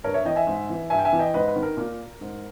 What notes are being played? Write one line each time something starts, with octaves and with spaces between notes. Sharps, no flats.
G2 A#4 C#5
C#5 E5
E3 D#5 G5
E5 G#5
G#2
E3
G2 E5 G#5
G5
E5 G#5
E3
D#5 G5
G#2 B4 D#5
B4
D#3
A#4
A#2 A#4
G#2